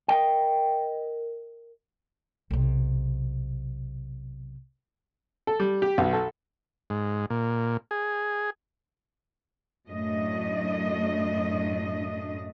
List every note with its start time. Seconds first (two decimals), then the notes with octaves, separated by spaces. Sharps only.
0.08 A#4 D#5 G5
2.51 B1 C3
5.47 A4
5.60 G3
5.82 G4
5.98 B1
6.13 A4
6.90 G#2
7.30 A#2
7.91 G#4
9.89 F#2 A2 A3 D4 D#5